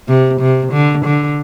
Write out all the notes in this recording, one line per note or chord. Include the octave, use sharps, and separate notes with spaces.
C3
C3
D3
D3